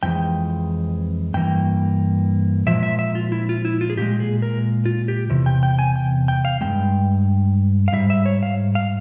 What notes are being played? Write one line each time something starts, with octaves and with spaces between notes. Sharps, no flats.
F2 E3 G#3 G5
G2 E3 A#3 G5
A#2 F3 G#3 E5
E5
E5
F4
E4
F4
E4
F4
G#4
A#2 G#3 G4
G#4
A#4
F4
G4
E2 C3
G5
G5
G#5
G5
G5
F5
G2 E3 G#3 G5
F5
G#2 G3 E5
E5
C#5
F5
F5